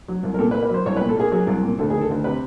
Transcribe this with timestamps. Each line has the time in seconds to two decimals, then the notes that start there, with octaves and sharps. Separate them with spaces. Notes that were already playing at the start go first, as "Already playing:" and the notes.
0.08 F#3
0.23 C2
0.34 A#4
0.39 A#2 A4
0.51 B4
0.55 A#3
0.63 B4
0.70 F#3 C5
0.86 C2 C#5
0.97 B4
1.01 A#2
1.09 A4
1.17 A#3 G#4
1.32 F#3 G#4
1.47 C2
1.63 A#2
1.79 D2 A4
1.90 D#3 G#4
2.01 A4
2.10 D2
2.24 C3 B4